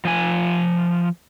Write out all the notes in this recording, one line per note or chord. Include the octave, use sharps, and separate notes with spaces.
F3 G#5